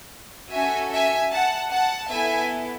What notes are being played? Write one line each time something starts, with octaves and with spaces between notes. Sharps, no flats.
C#4 F#4 A4 E5 G#5
E5 G#5
F#5 A5
F#5 A5
B3 E4 A4 E5 G#5